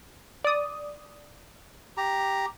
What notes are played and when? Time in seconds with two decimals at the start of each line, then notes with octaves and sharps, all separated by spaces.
0.44 D5 D#6
1.97 G4 A#5